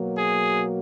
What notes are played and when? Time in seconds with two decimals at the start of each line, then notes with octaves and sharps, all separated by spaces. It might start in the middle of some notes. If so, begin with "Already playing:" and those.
Already playing: B2 F#3 A#3
0.17 G#4